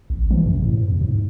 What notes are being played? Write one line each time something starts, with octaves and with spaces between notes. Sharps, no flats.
A1
E3
F#2
A2
E2
G#2